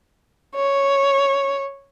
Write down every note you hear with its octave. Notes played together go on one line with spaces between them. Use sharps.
C#5